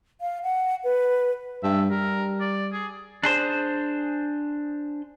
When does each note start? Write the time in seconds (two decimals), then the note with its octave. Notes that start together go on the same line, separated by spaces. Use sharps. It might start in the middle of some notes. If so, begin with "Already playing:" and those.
0.21 F5
0.43 F#5
0.84 B4
1.63 G2 E5
1.90 G3 A#4
2.40 D5
2.73 G#4
3.23 D4 G#4 C5